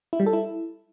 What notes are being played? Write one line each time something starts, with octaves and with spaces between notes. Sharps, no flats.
E4
G3
A4
E4